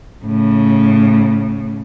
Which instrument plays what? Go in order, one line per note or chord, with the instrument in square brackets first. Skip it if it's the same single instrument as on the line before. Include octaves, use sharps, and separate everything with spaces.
[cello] A2 C#3